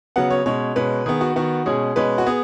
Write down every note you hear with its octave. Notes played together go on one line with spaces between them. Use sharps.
C#3 F#3 B3 F#5
C#5
B2 G#3 C#4 C#5
B2 G#3 C#4 B4
D#3 B3 G#4
F#4
D#3 B3 F#4
B2 G#3 C#4 G#4
B2 G#3 C#4 B4
F#4
B3 G#4